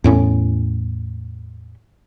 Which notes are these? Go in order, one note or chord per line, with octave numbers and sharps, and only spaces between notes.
E2 A2 C#4